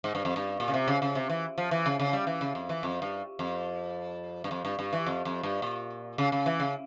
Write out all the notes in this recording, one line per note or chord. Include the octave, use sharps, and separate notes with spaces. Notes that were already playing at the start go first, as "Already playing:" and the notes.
G#2
G2
F2
G2
A#2
C#3
C3
C#3
C#3
C3
E3
F3
E3
C#3
C#3
G3
E3
C#3
F2
E3
F2
G2
F2
G2
F2
G2
G2
E3
F2
F2
G2
A#2
C#3
C#3
E3
C#3